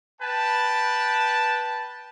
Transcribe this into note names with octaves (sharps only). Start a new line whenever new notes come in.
B4 G5 A5